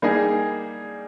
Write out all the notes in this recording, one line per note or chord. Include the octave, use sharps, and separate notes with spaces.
G3 A#3 D#4 G#4